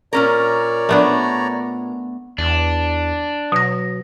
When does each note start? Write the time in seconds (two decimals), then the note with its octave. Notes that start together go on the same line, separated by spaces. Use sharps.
0.13 A#2 C#4 A#4 C#5 D5 A#5
0.89 A3 B3 D4
2.38 E2 D4
3.52 B2 F#3 A#6